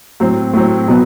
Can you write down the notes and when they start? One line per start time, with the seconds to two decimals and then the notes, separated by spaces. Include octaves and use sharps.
0.20 A2 F#3 C4
0.54 A2 F#3 C4
0.88 B2 F#3 B3